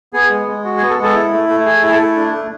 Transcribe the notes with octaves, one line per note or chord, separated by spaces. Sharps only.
B3 G#4
G#3
G#3
F#4
G#4
B3
A4
G#3
A4
E4
A3
A3
G#4
E4 G#4
A4
A3
D4
A3